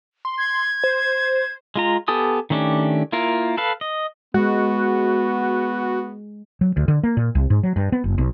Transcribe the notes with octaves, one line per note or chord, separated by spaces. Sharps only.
C6
G#6
C5
G#3 F4 A#5
B3 G4 A4 G#5 D#6
D#3 A3 C#4 D4 G4
A#3 E4 F4 A#4
A4 B4 F5
D#5
G#3 B3 F#4
F#3
D2
D3
A#3
A#2
C2
G#2
F#3
G2
B3
F#1
B1